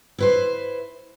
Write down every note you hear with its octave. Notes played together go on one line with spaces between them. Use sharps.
E4 B4 C5